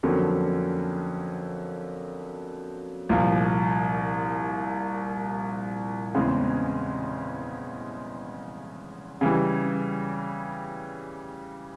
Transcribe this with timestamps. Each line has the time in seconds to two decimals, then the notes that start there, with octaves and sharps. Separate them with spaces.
0.03 F2 D3 F#3 A#3 C#4
3.09 C2 A#2 F3
6.15 E2 C#3 E3 G#3 C4
9.21 C#3 E3 G3